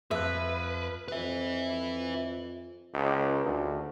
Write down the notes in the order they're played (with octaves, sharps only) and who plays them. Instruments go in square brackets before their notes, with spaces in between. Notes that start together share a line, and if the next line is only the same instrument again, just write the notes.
[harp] F2 F#6 [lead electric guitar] B4 [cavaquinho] E5
[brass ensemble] F2 [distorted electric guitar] B4 E5
[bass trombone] C#2
D2